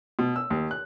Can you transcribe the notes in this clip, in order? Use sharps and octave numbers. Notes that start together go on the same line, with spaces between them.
B2
E6
D#2
F#6